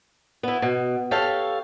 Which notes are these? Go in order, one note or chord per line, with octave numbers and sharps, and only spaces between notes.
B3 E4
B2
G4 A4 C#5 F5